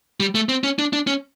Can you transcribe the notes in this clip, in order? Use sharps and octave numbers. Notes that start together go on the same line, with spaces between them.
G3
A3
C4
C#4
D4
D4
C#4